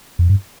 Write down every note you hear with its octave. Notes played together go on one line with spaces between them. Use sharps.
F2
G2